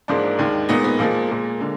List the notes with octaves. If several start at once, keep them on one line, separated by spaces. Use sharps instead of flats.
G#2 F3 G#3 A#3 D4
D#2 D#3 G#3
A#2 G#3 B3 D#4
B3
A#2 F3 G#3 A#3
A#2 G#3
D3 G#3